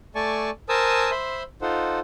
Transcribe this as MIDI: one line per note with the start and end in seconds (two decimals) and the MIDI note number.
0.15 0.50 57
0.15 0.50 74
0.15 0.50 80
0.15 0.50 81
0.15 0.50 85
0.69 1.11 70
0.69 1.11 72
0.69 1.11 80
0.69 1.11 81
0.69 1.11 87
0.69 1.11 88
1.11 1.43 72
1.11 1.43 76
1.11 1.43 83
1.11 1.43 84
1.62 2.00 63
1.62 2.00 65
1.62 2.00 69
1.62 2.00 72
1.62 2.00 78